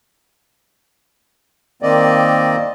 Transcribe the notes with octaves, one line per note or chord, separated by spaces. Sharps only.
D#3 A#3 C4 D5 D#5